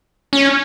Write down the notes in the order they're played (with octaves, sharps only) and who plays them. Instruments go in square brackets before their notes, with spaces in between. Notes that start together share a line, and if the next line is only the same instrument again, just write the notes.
[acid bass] C#4